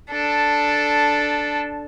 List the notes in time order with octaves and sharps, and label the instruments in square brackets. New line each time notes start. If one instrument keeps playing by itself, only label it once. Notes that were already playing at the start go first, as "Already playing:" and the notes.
[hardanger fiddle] D4 A4